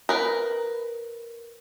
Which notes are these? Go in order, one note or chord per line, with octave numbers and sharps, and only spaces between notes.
A#4 B4